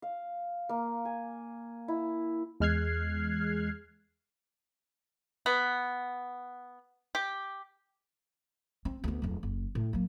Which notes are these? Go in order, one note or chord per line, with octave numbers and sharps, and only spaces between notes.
F5
A#3
G#5
E4
E2 G#3 F6 F#6 G#6 C7
B3
G4
C4
D2 B3
D1 F2
F#1
A2
F#3 A#3